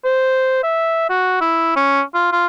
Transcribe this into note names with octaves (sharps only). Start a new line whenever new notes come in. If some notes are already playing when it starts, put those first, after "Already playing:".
C5
E5
F#4
E4
C#4
F4
F4